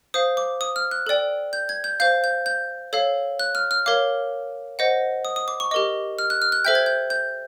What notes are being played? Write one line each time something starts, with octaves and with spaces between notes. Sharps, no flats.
C5 F5 D#6
D6
D#6
F6
F#6
A4 D5 G5
G6
G#6
G6
C5 F5 G6
G6
G6
A4 C#5 F5
F#6
F6
F6
A#4 C#5 F5 D6
C5 D#5 F#5
D#6
D#6
D6
C#6
G4 A#4 D#5 D6
F6
F#6
F6
F#6
A4 C5 E5 G5 G6
G#6
G6
G6